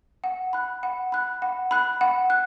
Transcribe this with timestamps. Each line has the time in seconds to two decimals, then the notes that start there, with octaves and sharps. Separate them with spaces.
0.24 F#5
0.53 B5 F#6
0.83 F#5
1.12 B5 F#6
1.42 F#5
1.71 B5 F#6
2.01 F#5
2.30 F#6